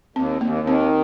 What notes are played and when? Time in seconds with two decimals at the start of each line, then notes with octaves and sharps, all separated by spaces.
0.16 D#2 C4
0.41 D#2 A#3
0.67 D#3 C4